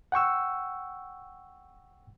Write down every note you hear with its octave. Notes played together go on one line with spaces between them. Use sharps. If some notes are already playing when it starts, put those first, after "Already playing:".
F#5 G5 C#6 E6